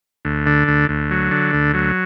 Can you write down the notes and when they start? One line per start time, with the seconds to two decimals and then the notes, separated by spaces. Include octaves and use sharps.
0.25 D2
0.46 D3
0.68 D2
0.89 D2
1.11 F#3
1.31 D3
1.53 D2
1.74 F#3